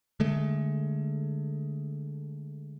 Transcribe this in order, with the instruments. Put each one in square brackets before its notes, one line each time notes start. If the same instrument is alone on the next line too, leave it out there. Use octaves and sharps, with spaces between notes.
[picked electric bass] D3 G#3 A3